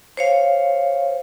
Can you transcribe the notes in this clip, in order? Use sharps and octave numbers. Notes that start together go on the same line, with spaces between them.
C5 C#5 F5